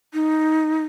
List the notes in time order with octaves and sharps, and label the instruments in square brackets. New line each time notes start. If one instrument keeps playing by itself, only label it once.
[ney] D#4